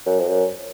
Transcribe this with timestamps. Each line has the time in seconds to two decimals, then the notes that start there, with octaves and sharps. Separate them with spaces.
0.06 F#2
0.20 F2
0.29 F#2